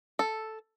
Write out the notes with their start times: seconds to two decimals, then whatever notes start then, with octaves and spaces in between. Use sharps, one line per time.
0.19 A4